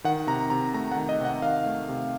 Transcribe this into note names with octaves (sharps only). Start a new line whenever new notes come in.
D#3 F#5
C3 A#5
C3 A#5
A3 A#5
D#3 F#5
D#5
C3 F#5
D#3 F5
A3
C3